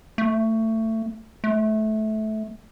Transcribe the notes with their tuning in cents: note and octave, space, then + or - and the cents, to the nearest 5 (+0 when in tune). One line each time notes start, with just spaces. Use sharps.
A3 +20
A3 -20